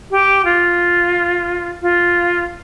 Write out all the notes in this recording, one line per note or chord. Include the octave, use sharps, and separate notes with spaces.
G4
F4
F4